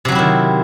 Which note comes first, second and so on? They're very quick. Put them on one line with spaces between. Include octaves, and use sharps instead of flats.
C3 F#3 C4 E4 D#3